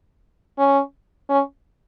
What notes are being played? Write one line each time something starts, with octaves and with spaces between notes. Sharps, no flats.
C#4
C#4